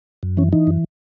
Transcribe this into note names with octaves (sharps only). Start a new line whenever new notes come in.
F#2
E3 C#4
E3 D#4
F#2